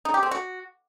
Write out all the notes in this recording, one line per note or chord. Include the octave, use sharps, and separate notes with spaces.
D#4
G4
C4
F#4